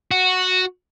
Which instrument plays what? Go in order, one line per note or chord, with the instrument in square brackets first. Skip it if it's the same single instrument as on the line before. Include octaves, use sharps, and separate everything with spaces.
[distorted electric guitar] F#4